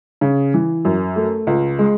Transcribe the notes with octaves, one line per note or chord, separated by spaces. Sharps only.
C#3
E3
F#2
A3
C#2
G#3